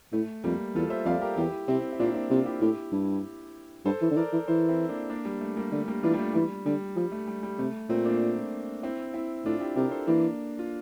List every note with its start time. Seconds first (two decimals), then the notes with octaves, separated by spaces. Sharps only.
0.12 A2 A3
0.44 F2 G3 A#3
0.75 E2 F4 A4
0.90 C5 E5
1.05 F2 D5 F5
1.21 G4 A#4
1.37 E2 E4 G4
1.68 C3 C4 E4
1.93 E4
1.99 A#2 A#3 D4
2.14 C4 E4
2.30 C3 D4 F4
2.46 E4 G4
2.61 A2 E4 G4
2.92 G2
3.85 G2 A4 C5
4.01 E3
4.11 D3
4.17 E3 A#4 D5
4.33 E3
4.48 E3 A4 C5
4.68 C4 E4
4.89 A#3 D4
5.10 A#3 D4
5.25 G3
5.41 A3
5.57 G3 A#3
5.72 D3 A3
5.88 G3 A#3
6.03 E3 D4 F4
6.14 G3
6.19 A3
6.34 E3 G3
6.65 D3 G3
6.96 F3 G3
7.12 A3
7.27 G3
7.43 G3
7.58 C3 A3
7.89 A#2 A3 C4
8.05 A#3 D4
8.83 C4 E4
9.14 C4 E4
9.45 A2 D4 F4
9.61 E4 G4
9.76 C3 G4 A#4
9.91 A4 C5
10.07 E3 A#3 D4
10.59 F4